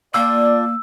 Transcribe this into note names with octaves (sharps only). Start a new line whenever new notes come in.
A#3 D4 F4 D5 G5 E6